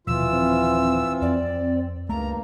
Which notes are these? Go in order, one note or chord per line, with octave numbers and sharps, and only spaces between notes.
D#1 D#2 B2 E3 F3 F4 E6
C4
F2 D5
C#2 G2 A3 A#3 A#5